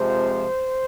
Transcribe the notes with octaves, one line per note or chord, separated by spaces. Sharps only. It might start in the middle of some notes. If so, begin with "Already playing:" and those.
Already playing: F2 C3 F3 G#3 C5